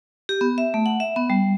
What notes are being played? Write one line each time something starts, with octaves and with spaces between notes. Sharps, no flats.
G4
B3
E5
A3
F#5
E5
B3
G3